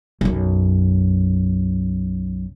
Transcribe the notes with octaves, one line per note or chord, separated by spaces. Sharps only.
B1 F#2